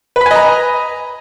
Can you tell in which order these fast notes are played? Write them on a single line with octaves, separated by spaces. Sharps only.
B4 B5 G#5 D#5 A#5